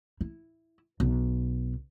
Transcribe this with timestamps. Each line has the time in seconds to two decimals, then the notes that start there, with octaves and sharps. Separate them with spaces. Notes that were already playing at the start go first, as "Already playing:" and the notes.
0.21 E4
1.00 B1